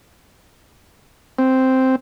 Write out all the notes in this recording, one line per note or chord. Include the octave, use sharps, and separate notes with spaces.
C4